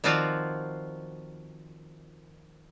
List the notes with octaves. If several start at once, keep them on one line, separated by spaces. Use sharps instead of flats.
D#3 F3 C4 F4 F#4 D5